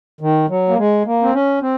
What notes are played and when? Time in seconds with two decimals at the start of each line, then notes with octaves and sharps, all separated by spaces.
0.21 D#3
0.49 F#3
0.69 A#3
0.78 G#3
1.06 A#3
1.23 C4
1.34 C#4
1.62 C4